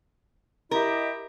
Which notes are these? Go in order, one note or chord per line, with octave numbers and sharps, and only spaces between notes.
E4 G4 A#4 D#5